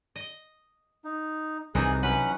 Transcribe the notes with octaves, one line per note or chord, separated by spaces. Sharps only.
D#5
D#4
C2 C3 E3 D#4 G#4 F#6
F#3 C#4 B4 F#5